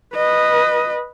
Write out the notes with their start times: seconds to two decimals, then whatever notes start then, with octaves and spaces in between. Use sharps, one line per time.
0.15 B4 D#5